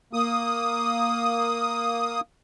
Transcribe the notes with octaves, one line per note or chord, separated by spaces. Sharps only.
A#3 D#6